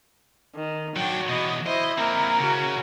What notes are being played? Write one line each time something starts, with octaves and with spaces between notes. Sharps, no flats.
D#3
F#3 D4 F#4 G5
B2 E3 D#5
E4 C5 D#5
A#3 C4 A#4
C#3 F#4